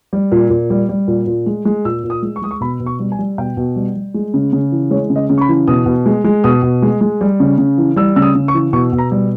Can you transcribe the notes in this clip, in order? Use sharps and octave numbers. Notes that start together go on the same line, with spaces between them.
G3
A#2
A#2
G3
G3
A#2
A#2
G#3
G#3
A#2 E6
A#2
D#6
G#3
C#6
G#3 D#6
C#6
B2 B5
B2
C#6
G3
G#5
G3
B2 G5
B2
G3
G3
G#3
C#3
C#3
E3
G#3 C#5
C#3
D#5
C#3
C#6
B5
E3
B2 D#6
B2
G#3
G#3
B2 D#6
B2
G#3
G#3
G3
C#3
C#3
E3
G3 E6
C#3 E6
D#6
C#3
C#6
E3
B2 C#6
B2
A#5
G3